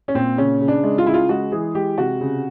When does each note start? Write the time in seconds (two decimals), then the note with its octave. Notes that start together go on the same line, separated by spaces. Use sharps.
0.08 C#4
0.15 A#2 C4
0.38 C#3 C#4
0.61 C#3
0.68 D4
0.84 G#3
0.98 F4
1.06 C#3 E4
1.14 F4
1.29 G#3 F#4
1.52 E3 G#4
1.75 G#3 G4
1.98 C3 F#4
2.21 C#3